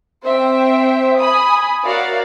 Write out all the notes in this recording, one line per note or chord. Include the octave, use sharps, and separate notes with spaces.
C4 C5 E5 G5
G#5 B5 D#6
F#4 A#4 C#5 D5 E5 F5